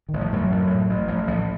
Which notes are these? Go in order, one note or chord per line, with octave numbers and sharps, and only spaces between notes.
A1 D#3
F3
A1 F#2 F#3
A1
A2
A1
A1 F3
A1 F3